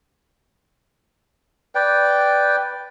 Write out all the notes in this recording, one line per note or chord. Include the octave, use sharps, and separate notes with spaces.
B4 D5 G5